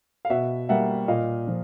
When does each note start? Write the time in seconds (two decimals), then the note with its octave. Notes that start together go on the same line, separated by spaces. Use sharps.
0.25 F5
0.29 B2 E5 F#5
0.69 G3 A#3 E5 F#5
1.08 A#2 D#5 F5
1.47 F3